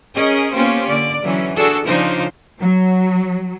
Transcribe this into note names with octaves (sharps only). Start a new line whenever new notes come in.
C#4 G#4 A#4 D#5
A#3 B3 C#4 F4 G4 C5
D3 A#3 D5
D3 E3 F#3 C#4
D4 F#4 G#4 A4
C#3 F3 D4 D#4 F4 C5
F#3